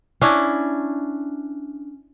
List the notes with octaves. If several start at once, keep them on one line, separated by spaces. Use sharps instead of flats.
C#4 D4 E4